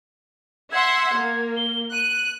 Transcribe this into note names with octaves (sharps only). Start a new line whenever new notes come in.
E5 F#5 C6 G#6
A#3
G7
F#6 D#7